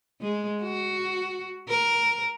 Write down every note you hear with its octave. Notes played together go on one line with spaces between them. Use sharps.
G#3
F#4
A#4